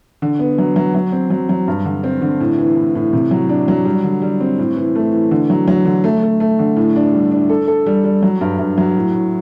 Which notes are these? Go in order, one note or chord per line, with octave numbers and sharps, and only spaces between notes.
D3
B3
F#3
F#3
F#3
C4
F#3
F#3
G2
D3
C4
D3
A2
E3
A2
A2
C3
F#3
D4
F#3
G3
D3
G3
C4
A2
E3
A3
E3
D3
F#3
F#3
D3
A3
A3
A3
D3
A2
D4
G3
D4
A4
A4
G3
G3
F#3
G2
G2
F#3
A2
A2